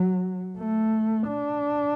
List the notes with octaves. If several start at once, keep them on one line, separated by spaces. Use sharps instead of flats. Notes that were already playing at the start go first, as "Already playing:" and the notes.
Already playing: F#3
A3
D4